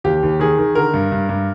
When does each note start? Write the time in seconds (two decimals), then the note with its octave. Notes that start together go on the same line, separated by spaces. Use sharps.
0.04 D#2 G4
0.23 D#2
0.40 D#3 G#4
0.59 D#3
0.75 D3 A#4
0.94 G2
1.12 G2
1.29 G2